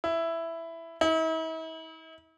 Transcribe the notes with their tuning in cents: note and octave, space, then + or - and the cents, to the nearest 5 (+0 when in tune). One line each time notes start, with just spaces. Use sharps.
E4 +5
E4 -45